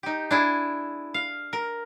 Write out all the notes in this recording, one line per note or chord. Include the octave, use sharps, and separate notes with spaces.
D#4 G4
D4 E4 G#4
F5
A#4